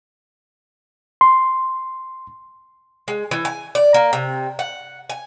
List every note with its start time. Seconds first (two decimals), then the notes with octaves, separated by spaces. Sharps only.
1.21 C6
3.08 G#3
3.31 E3
3.45 G#5
3.75 D5
3.94 A#3
4.13 C3
4.59 F#5
5.10 G#5